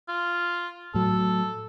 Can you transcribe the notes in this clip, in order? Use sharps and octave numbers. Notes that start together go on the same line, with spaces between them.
F4
A2 F#3 A4